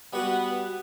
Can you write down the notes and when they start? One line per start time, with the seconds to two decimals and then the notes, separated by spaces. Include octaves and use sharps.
0.13 G3 B3 F#4